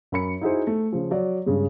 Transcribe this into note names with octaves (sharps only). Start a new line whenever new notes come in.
F#2 A#4 B5 C#7
D#4 E4 F#4 G#4 C5
A3
C#3 F3
F#3 D5
G2 C#3 G#3